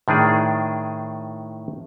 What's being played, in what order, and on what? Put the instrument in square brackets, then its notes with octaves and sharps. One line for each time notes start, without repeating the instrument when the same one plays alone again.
[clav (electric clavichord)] A2 D#3 D4 G#4